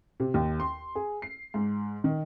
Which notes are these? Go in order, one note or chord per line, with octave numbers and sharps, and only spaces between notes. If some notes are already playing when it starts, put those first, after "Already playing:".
C3
D#2
C6
G#4
C7
G#2
D#3